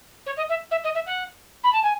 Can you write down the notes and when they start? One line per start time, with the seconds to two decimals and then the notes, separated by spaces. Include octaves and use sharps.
0.26 C#5
0.36 D#5
0.49 E5
0.71 E5
0.83 D#5
0.94 E5
1.06 F#5
1.63 B5
1.72 A5
1.83 G#5